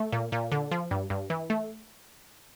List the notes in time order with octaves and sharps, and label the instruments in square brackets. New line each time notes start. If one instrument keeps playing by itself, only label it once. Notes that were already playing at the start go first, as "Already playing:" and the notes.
Already playing: [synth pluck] A3
A#2
A#2
D3
F3
G2
G2
E3
A3